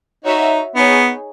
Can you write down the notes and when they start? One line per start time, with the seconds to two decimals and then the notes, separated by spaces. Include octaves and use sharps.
0.25 D#4 F#4 C#5 E5
0.75 B3 D#4 G#4 C#5